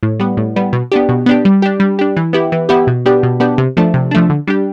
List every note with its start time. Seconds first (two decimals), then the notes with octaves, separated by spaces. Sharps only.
0.03 A2
0.20 G3 B3
0.37 A2
0.56 G3 B3
0.73 B2
0.92 B3 D4 G4
1.09 B2
1.26 B3 D4 G4
1.45 G3
1.62 D4 G4
1.80 G3
1.99 D4 G4
2.17 E3
2.33 B3 E4 G4
2.52 E3
2.69 B3 E4 G4
2.87 B2
3.06 B3 D4 G4
3.23 B2
3.40 B3 D4 G4
3.58 C3
3.77 F3 A3 D4
3.94 C3
4.11 F3 A3 D4
4.30 D3
4.47 G3 D4 G4